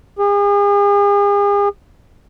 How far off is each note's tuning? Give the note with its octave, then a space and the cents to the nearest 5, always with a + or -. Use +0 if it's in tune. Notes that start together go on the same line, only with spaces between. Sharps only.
G#4 -40